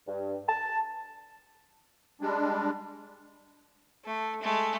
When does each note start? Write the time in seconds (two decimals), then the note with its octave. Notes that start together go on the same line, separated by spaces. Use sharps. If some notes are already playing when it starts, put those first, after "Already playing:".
0.08 G2
0.49 A5
2.21 G3 G#3 D4
4.05 A3
4.42 G#3 A3